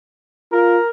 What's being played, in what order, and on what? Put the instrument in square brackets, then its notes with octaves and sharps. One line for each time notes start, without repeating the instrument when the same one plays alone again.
[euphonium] F4 [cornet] A#4